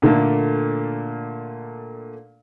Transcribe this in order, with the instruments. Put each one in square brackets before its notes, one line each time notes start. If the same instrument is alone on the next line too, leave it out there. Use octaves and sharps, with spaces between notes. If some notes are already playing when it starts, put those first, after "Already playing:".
[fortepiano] A#2 D3 A3 A#3